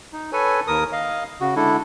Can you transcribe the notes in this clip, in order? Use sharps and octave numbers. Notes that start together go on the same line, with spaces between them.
D#4
A4 B4 C#5 G#5
D#2 A#4 D#6
D#5 F5
C#3 F#4
D3 G#3 D4 E4 A4